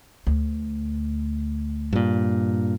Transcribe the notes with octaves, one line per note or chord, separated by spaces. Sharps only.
D2
G2 A#2